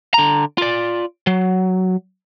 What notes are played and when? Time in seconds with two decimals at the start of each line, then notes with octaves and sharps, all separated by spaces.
0.14 D3 A#5
0.58 F4 D5
1.27 F#3